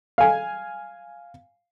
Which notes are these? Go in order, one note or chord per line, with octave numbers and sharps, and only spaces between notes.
F5 G#5